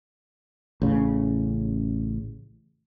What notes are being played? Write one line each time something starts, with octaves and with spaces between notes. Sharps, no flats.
A1 C#3